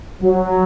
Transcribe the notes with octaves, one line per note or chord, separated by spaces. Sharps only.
F#3